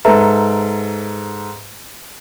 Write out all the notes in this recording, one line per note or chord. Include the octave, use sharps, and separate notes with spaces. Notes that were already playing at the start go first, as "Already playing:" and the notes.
G#2 A4 B4 E5 A#5